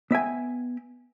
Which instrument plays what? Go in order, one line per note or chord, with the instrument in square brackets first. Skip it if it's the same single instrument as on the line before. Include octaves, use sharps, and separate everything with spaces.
[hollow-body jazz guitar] B3 E5 G5 G#5